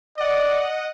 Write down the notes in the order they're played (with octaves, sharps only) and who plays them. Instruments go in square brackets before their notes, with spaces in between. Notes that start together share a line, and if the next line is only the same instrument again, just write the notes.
[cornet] D5 [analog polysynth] D#5 F#5